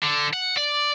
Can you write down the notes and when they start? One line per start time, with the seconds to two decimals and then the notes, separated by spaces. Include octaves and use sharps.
0.03 D3
0.33 F#5
0.58 D5